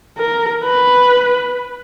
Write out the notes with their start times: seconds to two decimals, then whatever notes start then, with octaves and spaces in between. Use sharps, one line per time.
0.17 A#4
0.64 B4